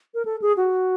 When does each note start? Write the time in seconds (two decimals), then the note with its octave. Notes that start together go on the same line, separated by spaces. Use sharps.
0.14 A#4
0.25 A4
0.42 G#4
0.57 F#4